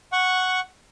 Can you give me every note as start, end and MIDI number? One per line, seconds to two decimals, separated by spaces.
0.12 0.60 78
0.12 0.60 85